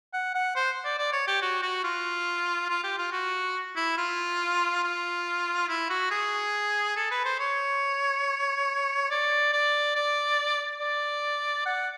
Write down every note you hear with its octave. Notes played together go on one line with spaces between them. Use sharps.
F#5
F#5
C5
D5
D5
C#5
G4
F#4
F#4
F4
F4
G4
F4
F#4
E4
F4
F4
E4
F#4
G#4
A4
B4
C5
C#5
D5
D5
D5
D5
F#5